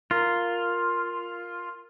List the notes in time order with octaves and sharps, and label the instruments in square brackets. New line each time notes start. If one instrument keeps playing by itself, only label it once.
[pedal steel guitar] F4 [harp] A#4